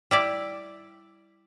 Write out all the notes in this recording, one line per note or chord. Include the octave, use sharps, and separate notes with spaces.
G3 E4 D5